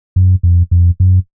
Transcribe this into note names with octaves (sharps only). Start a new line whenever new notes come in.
F#2
F2
F2
F#2